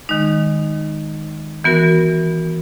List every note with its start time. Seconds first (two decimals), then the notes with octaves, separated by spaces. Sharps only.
0.09 D#3 G#3 D#4
1.64 E3 B3 F#4 A#4